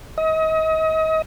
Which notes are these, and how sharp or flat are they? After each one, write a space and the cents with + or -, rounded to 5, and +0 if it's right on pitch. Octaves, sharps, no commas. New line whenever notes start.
D#5 +35